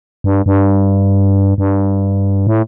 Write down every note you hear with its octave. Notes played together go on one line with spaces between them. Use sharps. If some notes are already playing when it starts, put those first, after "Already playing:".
G2
G2
G2
A2